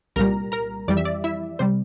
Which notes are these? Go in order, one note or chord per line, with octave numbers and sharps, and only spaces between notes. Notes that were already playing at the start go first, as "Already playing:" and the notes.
C2 A#2 G3 A#4 A#5
A#4 A#5
F2 E3 G3 D5
E5
D5
E4 E5
C3 G3 C5